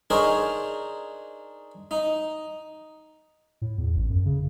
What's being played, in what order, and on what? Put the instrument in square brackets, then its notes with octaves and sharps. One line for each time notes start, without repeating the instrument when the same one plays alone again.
[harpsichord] D4 D#4 G#4 A#4 C5 C#5
D#4
[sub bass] A2
E2
A1
F#2
C#3